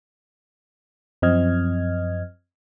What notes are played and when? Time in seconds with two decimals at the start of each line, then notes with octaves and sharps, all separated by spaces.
1.22 F#2 F3 C4 D#5 F6 G#6